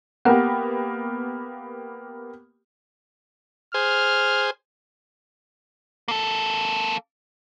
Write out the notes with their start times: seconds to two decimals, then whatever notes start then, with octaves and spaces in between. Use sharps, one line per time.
0.25 A#3 B3 G4 A#4 F#5
3.74 G#4 C5 F6
6.08 A#3 A4